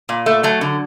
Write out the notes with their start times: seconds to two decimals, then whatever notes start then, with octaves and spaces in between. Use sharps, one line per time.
0.09 A#2
0.26 A3
0.43 F#3 A3
0.61 D3